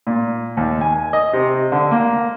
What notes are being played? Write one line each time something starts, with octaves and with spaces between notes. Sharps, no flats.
A#2
D#2
G#5
D#5
C3
D3
A#3